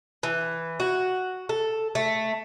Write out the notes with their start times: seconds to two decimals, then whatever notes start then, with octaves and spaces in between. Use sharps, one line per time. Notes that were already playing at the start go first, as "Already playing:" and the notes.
0.23 E3
0.80 F#4
1.49 A4
1.95 A3